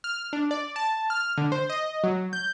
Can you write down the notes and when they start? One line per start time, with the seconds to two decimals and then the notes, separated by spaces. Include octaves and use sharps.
0.04 F6
0.33 D4
0.51 D5
0.76 A5
1.10 F6
1.38 D3
1.52 C5
1.70 D#5
2.04 F#3
2.33 G6